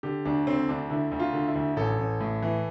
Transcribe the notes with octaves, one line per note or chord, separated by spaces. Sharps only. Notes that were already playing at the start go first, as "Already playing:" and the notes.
D3 G4
D2 D4
D3 C4
D2 D4
D3 E4
D2
F4
D3
E4
D2
A1 A4
A1
A2
E3